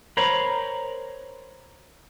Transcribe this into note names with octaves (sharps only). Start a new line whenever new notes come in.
A#4 C5 C#5 A#5 B5